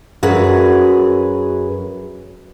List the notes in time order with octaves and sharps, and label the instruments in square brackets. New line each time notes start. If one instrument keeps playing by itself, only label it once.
[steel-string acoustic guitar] F#2 F#4 G#4 B4